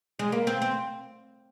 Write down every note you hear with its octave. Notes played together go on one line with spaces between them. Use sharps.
G#3
A#3
C4
C4